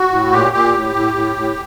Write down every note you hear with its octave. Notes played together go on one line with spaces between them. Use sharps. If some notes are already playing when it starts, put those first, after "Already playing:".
Already playing: F#4
A2
A#2 G4
A#2 G4
A2
A2
A2
A2